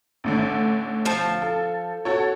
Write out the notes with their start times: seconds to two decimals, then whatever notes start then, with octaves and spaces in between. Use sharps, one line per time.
0.24 A1 A2 D3
1.05 F3 A5
1.42 A4
2.05 F#4 A4 C#5